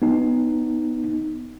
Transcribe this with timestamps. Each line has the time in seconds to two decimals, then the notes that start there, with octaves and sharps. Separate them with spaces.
0.02 B3 D#4